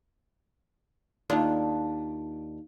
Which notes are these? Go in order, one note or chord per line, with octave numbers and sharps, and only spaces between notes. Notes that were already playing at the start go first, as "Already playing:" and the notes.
D#2 D4 F4